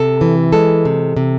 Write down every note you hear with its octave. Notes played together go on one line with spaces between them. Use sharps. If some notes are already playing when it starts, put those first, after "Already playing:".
Already playing: C3 A4
E3
G#3 A4
C3
C3